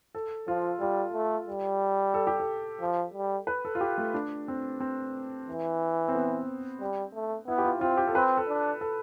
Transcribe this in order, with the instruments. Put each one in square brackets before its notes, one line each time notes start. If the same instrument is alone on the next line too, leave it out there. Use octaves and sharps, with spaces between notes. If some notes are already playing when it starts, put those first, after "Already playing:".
[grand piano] A4
[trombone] F3 [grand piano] F4
[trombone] G3 [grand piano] F4
[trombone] A3
G3
[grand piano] A4
G4
A4
[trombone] F3
G3
[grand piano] B4
A4
F4
G4
A3
D4
C4
C4
[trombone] E3
[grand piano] C4
B3
[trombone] G3
A3
[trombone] B3 [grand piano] E4
[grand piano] G4
F4
[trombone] C4 [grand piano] F4
[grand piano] G4
A4
[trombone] C4 [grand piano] B4
[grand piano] A4
[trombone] D4
[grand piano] A4